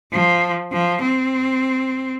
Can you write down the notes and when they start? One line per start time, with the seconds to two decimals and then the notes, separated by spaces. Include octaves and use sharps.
0.12 F3
0.72 F3
1.02 C4